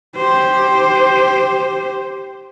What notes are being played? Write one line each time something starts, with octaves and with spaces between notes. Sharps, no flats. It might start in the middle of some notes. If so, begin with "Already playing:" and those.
G4 C5